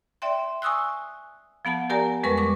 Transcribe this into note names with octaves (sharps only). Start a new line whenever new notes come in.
D5 E5 G5 C6
G#5 C#6 D#6 E6 F#6
F3 B3 F#5 A5
G4 A#4 D5 G#5 A#5
F2 G3 G#3 A#4 B4 C#6
A#4 C#6 D6